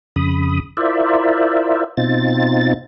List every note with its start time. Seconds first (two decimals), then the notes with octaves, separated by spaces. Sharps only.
0.16 F2 C#3 B5 D#6
0.77 E4 F4 A#4 C5 D5 E5
1.97 B2 C4 D#4 F4 A6